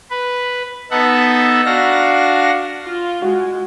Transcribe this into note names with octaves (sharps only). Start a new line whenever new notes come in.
B4
B3 D#4 A4 E5 F#5
D4 F#4 F5 A#6
F4
G#3 F#4